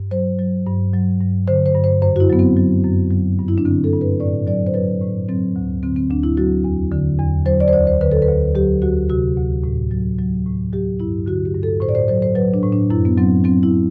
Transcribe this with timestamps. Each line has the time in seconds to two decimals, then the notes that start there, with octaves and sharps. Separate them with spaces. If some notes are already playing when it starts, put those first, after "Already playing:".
Already playing: G2
0.11 F#3 C5
0.39 F#3
0.66 G2
0.93 F#3
1.21 G2
1.48 D3 C5
1.66 C5
1.75 G2
1.84 C5
2.02 F#2 C5
2.16 F#4
2.20 E4
2.29 F#3 B3
2.39 C4
2.56 F#3
2.84 F#2
3.11 F#3
3.39 G2
3.48 E4
3.58 D4
3.65 D3 C4
3.84 A4
3.93 G2
4.01 B4
4.20 A2 D5
4.47 F#3 D5
4.67 C5
4.74 F#3 B4
5.02 A2
5.29 F#3 C4
5.56 D2
5.83 D3 C4
5.96 C4
6.10 D2 D4
6.23 E4
6.37 F#3 F#4
6.64 E2
6.92 D3
7.19 E2
7.46 F#3 C5
7.60 D5
7.68 C5
7.73 D2 D5
7.87 C5
8.01 D3 B4
8.11 A4
8.22 B4
8.28 D2
8.55 F#3 G4
8.82 D2 F#4
9.09 C3 F#4
9.37 D2
9.64 A2
9.91 F#3
10.19 F#3
10.46 A2
10.73 F#3 G4
11.00 G2 E4
11.26 D3 F#4
11.45 G4
11.55 G2
11.63 A4
11.81 A2 C5
11.89 D5
11.95 C5
12.08 F#3 C5
12.22 C5
12.35 F#3 B4
12.54 D4
12.63 A2
12.73 D4
12.90 F#2 E4
13.05 B3
13.17 F#3 C4
13.44 F#3 C4
13.63 E4